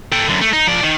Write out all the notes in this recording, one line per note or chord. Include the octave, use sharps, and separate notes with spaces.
A4 G5
F#2 D3
A3
D#4
F3 D5
D#3